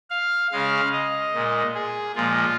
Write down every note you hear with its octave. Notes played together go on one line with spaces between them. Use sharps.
F5
C#3 G#3 F5
D#5
A#2 G#3
G#4
A#2 F3 G#3 F4